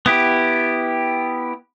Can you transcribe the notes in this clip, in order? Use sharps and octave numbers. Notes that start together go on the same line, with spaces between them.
B3 E4 G4